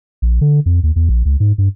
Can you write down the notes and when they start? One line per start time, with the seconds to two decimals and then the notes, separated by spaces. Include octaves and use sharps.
0.22 A#1
0.41 D3
0.66 F2
0.83 D#2
0.96 E2
1.09 A#1
1.25 C#2
1.40 G#2
1.58 G2